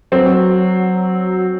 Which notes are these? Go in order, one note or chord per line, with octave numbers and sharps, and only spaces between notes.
F#3 C4